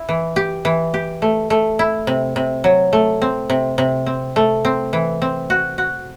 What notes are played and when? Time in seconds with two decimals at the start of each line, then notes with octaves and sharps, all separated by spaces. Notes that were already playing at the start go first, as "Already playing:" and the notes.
Already playing: E4
0.09 E3
0.36 G4
0.65 E3
0.94 G4
1.22 A3
1.50 A3
1.79 E4
2.07 C3
2.36 C3
2.64 F#3
2.93 A3
3.22 C4
3.50 C3
3.78 C3
4.06 C4
4.36 A3
4.65 C4
4.93 E3
5.22 C4
5.50 F#4
5.78 F#4